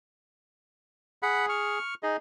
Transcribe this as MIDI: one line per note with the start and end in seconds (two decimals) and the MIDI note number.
1.23 1.79 68
1.23 1.46 78
1.23 1.46 83
1.49 1.94 85
1.49 1.94 89
2.03 2.17 63
2.03 2.17 68
2.03 2.17 75